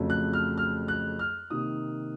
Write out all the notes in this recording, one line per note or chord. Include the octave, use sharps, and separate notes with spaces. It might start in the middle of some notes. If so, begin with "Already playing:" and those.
Already playing: F2 C#3 F#3 A3
F#6
F6
F6
F#6
F6
C3 D#3 A#3 D#4 D#6